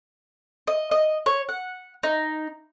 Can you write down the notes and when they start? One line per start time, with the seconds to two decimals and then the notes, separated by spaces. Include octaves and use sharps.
0.67 D#5
0.91 D#5
1.26 C#5
1.49 F#5
2.03 D#4